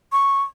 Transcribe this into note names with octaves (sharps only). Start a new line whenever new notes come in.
C#6